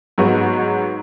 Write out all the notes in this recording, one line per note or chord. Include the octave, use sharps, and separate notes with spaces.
G#2 F#3 G#3 B3 F#4 C#6